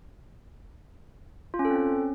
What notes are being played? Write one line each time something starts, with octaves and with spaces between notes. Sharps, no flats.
F4
C#4
A4
C4
C#4